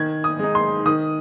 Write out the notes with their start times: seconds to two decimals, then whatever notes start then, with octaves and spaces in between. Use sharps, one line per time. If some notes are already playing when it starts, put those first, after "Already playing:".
Already playing: D#3 G#6
0.24 D#6
0.39 G#3 D#4
0.55 C6
0.86 D#3 D#6